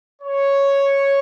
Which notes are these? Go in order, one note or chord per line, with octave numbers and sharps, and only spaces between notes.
C#5